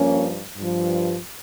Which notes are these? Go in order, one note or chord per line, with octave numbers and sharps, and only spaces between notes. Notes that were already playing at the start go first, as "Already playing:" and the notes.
Already playing: G2 F3 A#3 C#4
G2 F3